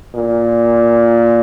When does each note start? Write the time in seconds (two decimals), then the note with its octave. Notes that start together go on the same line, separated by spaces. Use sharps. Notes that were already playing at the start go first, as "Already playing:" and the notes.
0.13 A#2